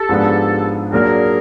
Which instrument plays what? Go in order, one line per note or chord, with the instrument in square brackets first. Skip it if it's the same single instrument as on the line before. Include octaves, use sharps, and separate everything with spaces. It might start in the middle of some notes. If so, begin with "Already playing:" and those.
Already playing: [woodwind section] G4 A4
[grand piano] G#2 F3 G#3 B3 D4
[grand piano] A#2 F#3 A#3 D4 [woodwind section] G#4 A#4